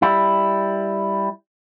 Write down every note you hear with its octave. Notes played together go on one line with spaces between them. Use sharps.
G3 E4